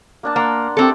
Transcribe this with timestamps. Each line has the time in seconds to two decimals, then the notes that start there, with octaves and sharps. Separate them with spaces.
0.23 A#3 D4 A5
0.36 A#3 F#5 A#5 C6
0.77 A3 C4 D4 G4 A4